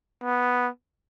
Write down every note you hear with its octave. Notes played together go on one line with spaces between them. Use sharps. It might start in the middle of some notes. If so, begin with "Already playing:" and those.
B3